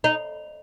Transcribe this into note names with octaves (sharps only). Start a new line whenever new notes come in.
D#4